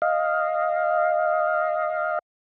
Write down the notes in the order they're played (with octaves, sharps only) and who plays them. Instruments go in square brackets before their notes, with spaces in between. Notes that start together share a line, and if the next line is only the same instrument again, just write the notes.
[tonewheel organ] D#5 F5